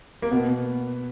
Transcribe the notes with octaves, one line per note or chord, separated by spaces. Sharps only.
A#3
B2 B3